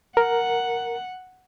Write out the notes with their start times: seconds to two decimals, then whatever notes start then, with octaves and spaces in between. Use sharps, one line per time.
0.17 A#4 F#5